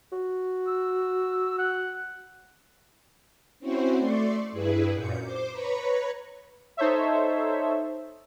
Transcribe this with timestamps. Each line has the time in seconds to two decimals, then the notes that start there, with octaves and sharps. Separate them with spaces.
0.12 F#4
0.67 E6
1.58 F#5
3.60 C4 C#4 E4 F#4 C5
3.98 A3 D5 C6 C#6
4.52 G2 E4 G#4 B4
4.92 F#2 A#2 G6 C#7
5.21 C5 D6
5.50 B4 C#5 A#5 B5 C#6
6.77 D#4 A4 C5 C#5 E5